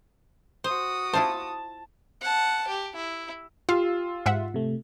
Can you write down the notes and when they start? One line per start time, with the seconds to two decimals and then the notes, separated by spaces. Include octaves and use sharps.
0.64 F#4 C5 D#6
1.13 E4 F4 C5 A5
2.21 F#5 A5
2.68 G4
2.96 E4
3.69 F4 G4 F5 C6 E6
4.26 G#2 E5 F#5
4.54 C3 A3